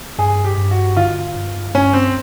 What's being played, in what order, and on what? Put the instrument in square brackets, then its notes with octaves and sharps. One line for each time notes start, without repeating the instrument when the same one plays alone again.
[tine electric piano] G2 [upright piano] G#4
[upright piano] G4
[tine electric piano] G2
[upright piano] F#4
[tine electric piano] D3 [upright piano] F4
[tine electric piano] G2
[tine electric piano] G2 [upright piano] C#4
[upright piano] C4